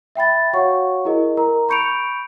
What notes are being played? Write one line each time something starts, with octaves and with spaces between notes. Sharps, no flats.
E5 G5 B5 A6
F#4 C#5 F5 F#5 C#6
E4 G#4 A#4 D#5
A#4 A#5
B5 C#6 G6 C#7 D7 F7